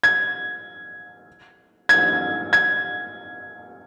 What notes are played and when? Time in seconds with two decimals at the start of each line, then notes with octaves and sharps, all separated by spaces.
0.03 G#6
1.89 G#6
2.53 G#6